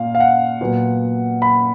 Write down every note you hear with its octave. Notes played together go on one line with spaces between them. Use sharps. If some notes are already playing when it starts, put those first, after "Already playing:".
Already playing: A#2 F5
F5
F#5
A#2 F#3 B3
B5